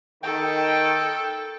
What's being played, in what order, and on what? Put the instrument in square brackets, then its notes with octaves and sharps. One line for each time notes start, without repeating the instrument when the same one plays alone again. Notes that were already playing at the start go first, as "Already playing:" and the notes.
[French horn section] D#3 [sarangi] A4 [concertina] G5